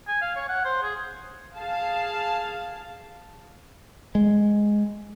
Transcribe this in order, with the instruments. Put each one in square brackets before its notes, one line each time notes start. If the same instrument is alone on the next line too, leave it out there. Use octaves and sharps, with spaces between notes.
[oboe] G#5
F5
C#5
F#5
C5
G#4
[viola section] G#4 F5 A5
[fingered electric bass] G#3